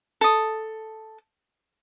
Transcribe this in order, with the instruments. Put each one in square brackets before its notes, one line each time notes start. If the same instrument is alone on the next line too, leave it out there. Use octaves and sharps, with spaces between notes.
[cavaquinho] A4 D#6